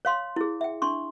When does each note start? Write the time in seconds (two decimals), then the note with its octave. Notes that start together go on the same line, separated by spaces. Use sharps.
0.05 C#5 F5 C6
0.36 E4 G#4
0.61 E5 G5
0.82 D4 C6 C#6